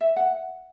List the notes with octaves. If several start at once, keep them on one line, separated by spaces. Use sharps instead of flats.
E5
F#5